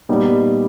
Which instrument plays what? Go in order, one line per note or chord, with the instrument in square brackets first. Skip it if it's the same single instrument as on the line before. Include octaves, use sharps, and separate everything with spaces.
[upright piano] A#2 G3 B3 D#4 G4